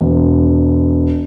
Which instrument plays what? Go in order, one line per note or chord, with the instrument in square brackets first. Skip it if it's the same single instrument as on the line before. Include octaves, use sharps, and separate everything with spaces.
[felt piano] E1